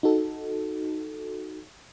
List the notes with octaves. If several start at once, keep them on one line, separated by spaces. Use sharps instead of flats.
D#4 F#4 A4